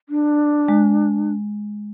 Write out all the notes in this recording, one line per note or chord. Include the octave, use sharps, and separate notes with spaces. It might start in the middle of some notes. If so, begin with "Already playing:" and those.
D4
G#3